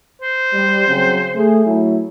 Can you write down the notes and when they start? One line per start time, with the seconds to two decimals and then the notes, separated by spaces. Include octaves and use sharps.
0.21 C5
0.54 G3
0.87 C#3 F#3 C4
1.35 A3 G#4
1.65 F#3 A3 E4